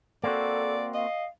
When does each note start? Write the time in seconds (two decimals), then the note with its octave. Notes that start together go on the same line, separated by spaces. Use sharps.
0.24 A#3 C4 F#4 A4 D5
0.94 D#5 F5